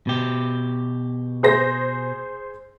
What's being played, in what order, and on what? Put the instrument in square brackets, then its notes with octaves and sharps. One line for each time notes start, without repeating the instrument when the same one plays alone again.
[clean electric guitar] B2 G4
[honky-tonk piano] G#4 C5 A#6